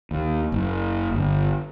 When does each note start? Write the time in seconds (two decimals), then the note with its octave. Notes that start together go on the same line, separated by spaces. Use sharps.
0.11 D#2
0.52 F#1
1.14 G1